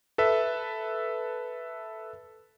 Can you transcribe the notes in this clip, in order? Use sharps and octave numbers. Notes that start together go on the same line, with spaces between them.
A4 B4 E5